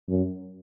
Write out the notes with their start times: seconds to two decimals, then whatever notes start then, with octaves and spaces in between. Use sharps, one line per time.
0.08 F#2